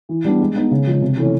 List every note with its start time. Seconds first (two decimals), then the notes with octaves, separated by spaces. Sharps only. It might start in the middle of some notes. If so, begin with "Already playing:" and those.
0.09 E3
0.25 G3 B3 D4
0.41 G#3
0.55 B3 D#4
0.71 C#3
0.87 F3 G#3
1.02 C3
1.17 E3 A3 C#4